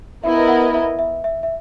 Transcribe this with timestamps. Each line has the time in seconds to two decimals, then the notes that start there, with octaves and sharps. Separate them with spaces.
0.24 B3 E4 A#4 D#5 E5
0.48 F#5
0.74 E5
0.99 E5
1.24 E5
1.43 E5